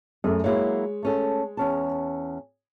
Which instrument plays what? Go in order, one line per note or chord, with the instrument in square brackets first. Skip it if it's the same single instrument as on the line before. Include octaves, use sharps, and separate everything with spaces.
[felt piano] F#2 A3 [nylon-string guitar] G#4
[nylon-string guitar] F#3 A#3 E4 [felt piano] G#3 C#5
[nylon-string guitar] A3 C#4 A4
E2 C#4 A5